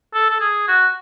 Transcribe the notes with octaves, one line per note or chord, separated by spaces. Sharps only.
A4
A4
G#4
F#4